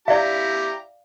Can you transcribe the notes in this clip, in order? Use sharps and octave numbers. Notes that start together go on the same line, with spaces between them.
E4 G4 D5 E5 F5 A#5